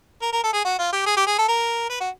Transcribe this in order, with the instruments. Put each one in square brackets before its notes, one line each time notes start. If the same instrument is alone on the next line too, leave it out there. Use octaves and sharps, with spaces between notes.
[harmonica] A#4
A#4
A4
G#4
F#4
F4
G4
G#4
G4
G#4
A4
A#4
B4
F#4